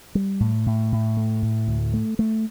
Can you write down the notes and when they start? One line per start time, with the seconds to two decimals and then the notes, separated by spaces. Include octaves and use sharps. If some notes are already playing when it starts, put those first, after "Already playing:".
0.15 G3
0.40 A2
0.66 A2
0.92 A2
1.17 A3
1.42 A2
1.68 D2
1.94 A3
2.19 A3